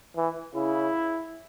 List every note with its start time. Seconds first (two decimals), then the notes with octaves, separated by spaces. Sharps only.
0.17 E3
0.55 C#3 E4